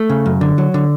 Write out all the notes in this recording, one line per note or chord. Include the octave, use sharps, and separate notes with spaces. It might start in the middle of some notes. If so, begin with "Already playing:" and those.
Already playing: A3
C#3
F#2
D3
F#3
D3